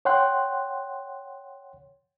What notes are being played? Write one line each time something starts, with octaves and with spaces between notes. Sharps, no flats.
C#5 F#5 G5 C6 F#6